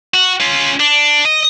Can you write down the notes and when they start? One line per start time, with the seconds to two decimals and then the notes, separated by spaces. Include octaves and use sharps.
0.14 F#4
0.40 C#4 F4
0.80 D4
1.25 D#5